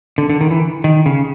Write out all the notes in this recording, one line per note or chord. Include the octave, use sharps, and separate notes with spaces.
D3
D3
D#3
E3
D#3
C#3